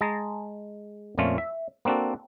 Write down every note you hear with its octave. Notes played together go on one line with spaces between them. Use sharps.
G#3 G#4 A5 A#5
F2 A#2 A3 C#4 F4
E5
A#3 C4 D4 F#4 A4